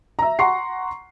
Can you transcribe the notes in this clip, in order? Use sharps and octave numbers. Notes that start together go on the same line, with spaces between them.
E5 A#5
F#5 A#5 C6 C#6 C7